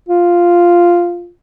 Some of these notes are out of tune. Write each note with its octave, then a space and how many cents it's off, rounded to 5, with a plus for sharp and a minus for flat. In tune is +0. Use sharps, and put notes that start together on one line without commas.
F4 -5